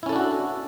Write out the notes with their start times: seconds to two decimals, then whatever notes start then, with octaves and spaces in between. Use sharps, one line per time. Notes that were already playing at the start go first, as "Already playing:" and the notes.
0.03 E4
0.06 C#4
0.09 A4
0.13 D4
0.16 F#4